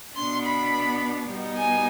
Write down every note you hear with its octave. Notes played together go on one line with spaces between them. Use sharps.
B2 B3 D4 C6
B5
B2 G3 B3 D#4
G#5